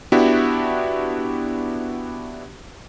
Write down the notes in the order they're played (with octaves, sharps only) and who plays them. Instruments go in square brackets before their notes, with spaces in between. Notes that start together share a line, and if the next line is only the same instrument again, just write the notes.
[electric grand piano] B3 D4 E4 F#4 G4 E5